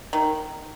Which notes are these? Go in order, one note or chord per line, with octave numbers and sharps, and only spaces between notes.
D#3